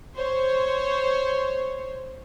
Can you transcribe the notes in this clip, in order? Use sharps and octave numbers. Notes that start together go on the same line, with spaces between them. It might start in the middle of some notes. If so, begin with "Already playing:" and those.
C5 C#5